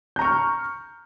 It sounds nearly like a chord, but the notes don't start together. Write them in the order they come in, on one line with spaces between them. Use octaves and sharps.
G6 A#5 C#6 F6